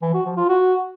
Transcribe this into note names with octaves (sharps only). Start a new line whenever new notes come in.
E3
F#4
F3
F4
F#4